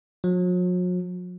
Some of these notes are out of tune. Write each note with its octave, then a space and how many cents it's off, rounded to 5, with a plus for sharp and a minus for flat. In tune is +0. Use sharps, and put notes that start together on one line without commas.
F#3 -45